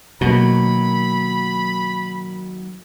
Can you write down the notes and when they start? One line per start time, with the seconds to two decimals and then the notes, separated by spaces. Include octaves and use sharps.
0.21 B2 D#3 F#3 A#3 B5